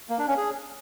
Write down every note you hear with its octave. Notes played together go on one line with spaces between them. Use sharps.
A#3
D4
C#4
G#4